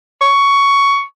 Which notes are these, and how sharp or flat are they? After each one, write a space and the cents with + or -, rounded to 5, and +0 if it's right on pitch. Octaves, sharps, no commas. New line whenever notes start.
C#6 +10